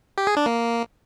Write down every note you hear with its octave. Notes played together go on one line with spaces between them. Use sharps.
G4
G#4
D4
A#3